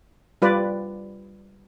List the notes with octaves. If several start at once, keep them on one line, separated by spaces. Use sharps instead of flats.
G3 F4 B4 D5